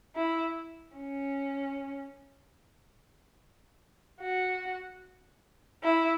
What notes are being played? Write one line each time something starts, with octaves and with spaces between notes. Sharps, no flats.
E4
C#4
F#4
E4